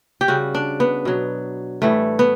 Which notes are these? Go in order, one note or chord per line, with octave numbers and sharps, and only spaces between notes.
G4
C#3 G3 F#4
D4
B3
B2 F#3
A2 E3 G3 A3
B3